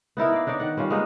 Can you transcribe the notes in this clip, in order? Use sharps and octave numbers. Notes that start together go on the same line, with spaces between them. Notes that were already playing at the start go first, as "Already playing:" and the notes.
B3 D#4 E4 A#4
D5 F5
D4 D#4 C#5 D5
D#3 F#5
G3 C#4 F4
G#3 A#3 B3 D#4